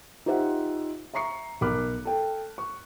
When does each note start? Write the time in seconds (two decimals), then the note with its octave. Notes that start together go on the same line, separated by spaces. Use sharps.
0.26 D#4 F4 G4 C5 E5 F#5
1.14 E5 A#5 C#6 C7 C#7
1.61 B1 A#4 B5 D6 F6 F#6
2.05 A4 G5
2.58 C#6